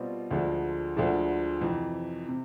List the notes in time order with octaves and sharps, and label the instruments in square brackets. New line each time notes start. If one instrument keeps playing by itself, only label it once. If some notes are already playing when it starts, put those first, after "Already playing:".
Already playing: [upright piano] B2 G3 C4 F4
D2 D3 F3 G#3
D2 D3 F3 G#3
F2 C3 E3
C3